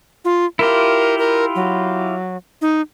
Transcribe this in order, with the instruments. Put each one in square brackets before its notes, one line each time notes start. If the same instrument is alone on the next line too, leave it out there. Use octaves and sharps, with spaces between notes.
[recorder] F4
[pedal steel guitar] E4 F4 G4 [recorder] A#4
[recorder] A#4
F#3
D#4